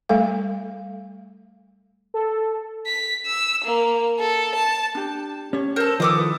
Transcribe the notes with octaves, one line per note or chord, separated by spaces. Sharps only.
G3 A3 A4 F5
A4
B6
E6
A#3
A4
A5
D4 G4
C#4 G4 C#5
A4 A#4 C5
D#3 F3 A4 B4 D#5 D6 D#6
E4 B4